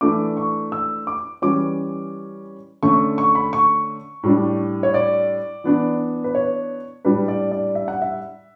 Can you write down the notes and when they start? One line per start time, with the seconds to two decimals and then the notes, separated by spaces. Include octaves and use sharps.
0.01 E3 A3 D4 D6
0.37 C#6
0.72 E6
1.07 D6
1.42 E3 G3 C#4 D6
2.83 D3 A3 C#4 C#6
3.18 C#6
3.35 B5
3.53 C#6
4.23 A2 G3 D4
4.83 C#5
4.94 D5
5.64 E3 B3 D4
6.24 B4
6.35 C#5
7.05 A2 G3 D4 B4
7.28 D5
7.52 D5
7.75 E5
7.88 F#5
8.02 E5